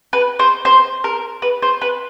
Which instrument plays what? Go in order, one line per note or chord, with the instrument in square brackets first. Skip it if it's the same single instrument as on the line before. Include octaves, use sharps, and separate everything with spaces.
[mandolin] B4
C5
C5
A#4
B4
C5
B4